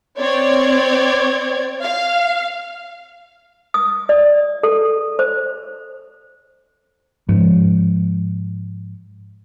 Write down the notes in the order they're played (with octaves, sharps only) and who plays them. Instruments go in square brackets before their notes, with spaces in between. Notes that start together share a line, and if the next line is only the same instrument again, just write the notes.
[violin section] C4 C#5 D5 G#6
F5
[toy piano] D#6
D5
A4
C5
[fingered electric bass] G#2 F3